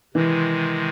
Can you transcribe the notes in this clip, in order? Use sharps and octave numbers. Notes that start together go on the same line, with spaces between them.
C3 D#3 E3 G#3